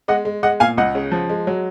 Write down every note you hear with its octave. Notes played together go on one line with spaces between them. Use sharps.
G#3 D#5 F#5
G#3
G#3 D#5 F#5
A#2 F5 G#5
C#2 D#5 F#5
C#3
F3
G#3
F#3